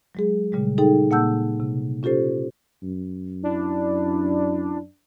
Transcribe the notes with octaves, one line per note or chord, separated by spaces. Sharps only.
F#3 G#3 G#4
A#2 C#3 G3 G#3
D#4 G#4 A4 G5
A#2 A#3 F#5 A5 E6 G6
C3
C#4 F4 G4 A4 C5
F#2
D4 E4